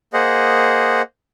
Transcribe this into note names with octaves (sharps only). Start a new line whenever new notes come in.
A#3 G#4 C5 D#5 F#5